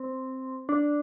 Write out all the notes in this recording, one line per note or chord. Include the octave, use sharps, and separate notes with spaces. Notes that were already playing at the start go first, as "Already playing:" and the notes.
Already playing: C4
D4